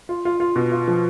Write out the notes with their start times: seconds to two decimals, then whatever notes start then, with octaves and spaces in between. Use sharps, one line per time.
0.09 F4
0.25 F4
0.40 F4
0.56 B2
0.72 F4
0.88 F3